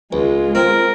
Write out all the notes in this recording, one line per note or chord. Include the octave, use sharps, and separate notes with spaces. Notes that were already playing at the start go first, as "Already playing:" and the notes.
C#2 G#3 F4
C4 A#4